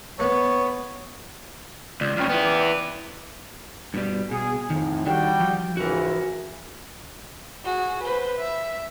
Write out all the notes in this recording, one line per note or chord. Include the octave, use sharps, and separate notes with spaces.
B3 C#5
C#2 D5
F2 C#3 G5 F6
B3 E4 D5 G5
D6
G2 B2 G3
B2 G#4
F2 A2 D#3
D#3 G3 D4 F#4 G5
F3
C#2 G#2 E3 F#4 A#4
F#4 G#4
B4 C5
E5